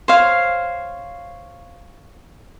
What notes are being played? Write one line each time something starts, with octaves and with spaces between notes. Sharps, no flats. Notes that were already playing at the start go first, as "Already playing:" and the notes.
C5 C#5 F5